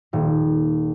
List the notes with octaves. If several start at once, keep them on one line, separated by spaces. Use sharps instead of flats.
D#1